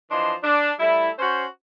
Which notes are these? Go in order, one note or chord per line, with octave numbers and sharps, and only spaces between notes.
E3 F3 D4 D#5 C6
D4
G3 A3 E4
C#4 F#4 C5